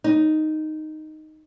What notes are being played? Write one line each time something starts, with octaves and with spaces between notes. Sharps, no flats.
D#4